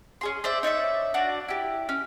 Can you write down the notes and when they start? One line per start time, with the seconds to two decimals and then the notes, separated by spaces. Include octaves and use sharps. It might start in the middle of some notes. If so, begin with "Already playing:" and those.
0.21 C#4 G#4 C6
0.44 C5 D5 E5
0.63 D#4 C#5 D5 E5
1.14 D4 F#4 D5
1.48 E4 G4
1.89 C#4